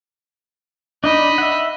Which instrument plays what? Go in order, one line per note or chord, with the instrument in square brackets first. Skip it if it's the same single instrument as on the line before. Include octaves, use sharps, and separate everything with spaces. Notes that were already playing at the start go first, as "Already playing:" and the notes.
[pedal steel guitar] D4 D#4 D5 [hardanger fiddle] D#5 B5
[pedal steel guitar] E5 F#5